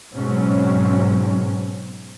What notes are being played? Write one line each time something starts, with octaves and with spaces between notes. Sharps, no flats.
G#2 B2 F#3 C4 C#4